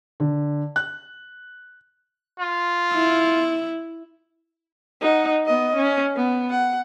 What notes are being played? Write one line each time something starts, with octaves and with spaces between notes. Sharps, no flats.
D3
F#6
F4
E4
D#4 F#5
B3 D#5
C#4
B3
F#5